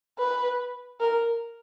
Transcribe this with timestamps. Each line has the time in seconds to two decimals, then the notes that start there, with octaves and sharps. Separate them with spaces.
0.18 B4
1.00 A#4